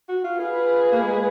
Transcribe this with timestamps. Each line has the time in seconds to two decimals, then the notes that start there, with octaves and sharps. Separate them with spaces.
0.09 F#4
0.24 F4
0.39 F4 G#4 B4
0.93 A#3
1.02 G#3